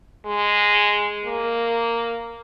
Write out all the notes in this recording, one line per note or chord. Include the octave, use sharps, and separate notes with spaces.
G#3
A#3